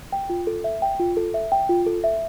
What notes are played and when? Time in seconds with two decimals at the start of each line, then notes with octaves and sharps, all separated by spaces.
0.12 G5
0.30 F4
0.47 A4
0.64 E5
0.82 G5
1.00 F4
1.17 A4
1.34 E5
1.52 G5
1.69 F4
1.86 A4
2.04 E5